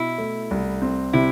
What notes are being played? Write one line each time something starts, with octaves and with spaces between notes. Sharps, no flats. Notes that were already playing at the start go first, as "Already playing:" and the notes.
Already playing: B2 E4
A3
C2
C4
C3 E4